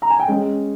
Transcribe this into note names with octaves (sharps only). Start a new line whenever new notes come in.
A#5
G#5
G5
G#3 C#4